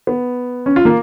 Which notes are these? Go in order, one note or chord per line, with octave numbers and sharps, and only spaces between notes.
B3
C#4
F4
A#3